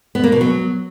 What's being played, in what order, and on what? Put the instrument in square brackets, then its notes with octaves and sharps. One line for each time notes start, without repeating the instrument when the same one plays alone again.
[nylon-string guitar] B3
A#3
B2
F#3